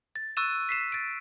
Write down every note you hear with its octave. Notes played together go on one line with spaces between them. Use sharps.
A6
C#6 E6 F#6 A6 D#7 E7
B6 C7 E7
A6 D7